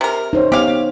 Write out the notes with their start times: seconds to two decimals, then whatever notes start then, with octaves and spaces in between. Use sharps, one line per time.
0.01 C3 A#4
0.33 D#4 C5 C#5
0.52 B3 G4 F5